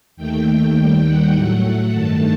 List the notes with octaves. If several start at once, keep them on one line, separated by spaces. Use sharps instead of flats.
D#2 D#3 A3 G5
D#2 D#3 G3
F#5
A2 F#3 A3
G2 D#3 A3 A5